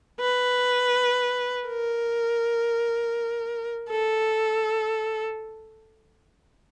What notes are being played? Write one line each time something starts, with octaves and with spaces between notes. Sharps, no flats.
B4
A#4
A4